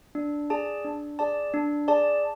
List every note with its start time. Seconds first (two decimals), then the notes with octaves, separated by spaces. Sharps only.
0.15 D4
0.50 G#4 D5 A5
0.85 D4
1.19 G#4 D5 A5
1.54 D4
1.88 G#4 D5 A5